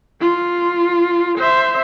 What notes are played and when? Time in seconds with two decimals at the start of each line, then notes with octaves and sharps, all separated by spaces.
0.21 F4
1.38 C5 E5